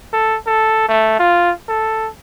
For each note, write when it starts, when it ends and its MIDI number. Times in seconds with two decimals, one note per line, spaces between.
0.13 0.37 69
0.47 0.86 69
0.88 1.14 57
1.19 1.52 65
1.68 2.09 69